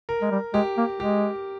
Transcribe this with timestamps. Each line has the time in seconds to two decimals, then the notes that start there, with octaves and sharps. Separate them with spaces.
0.09 A#4
0.22 G#3
0.31 G3
0.54 G#3 G4
0.77 A#3
1.00 G#3 G4